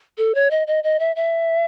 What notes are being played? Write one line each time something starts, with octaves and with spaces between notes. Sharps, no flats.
A4
C#5
D#5
D#5
D#5
E5
E5